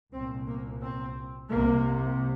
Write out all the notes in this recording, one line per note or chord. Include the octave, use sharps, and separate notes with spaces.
C2 A#2 C4
A#3
C4
C2 C3 A#3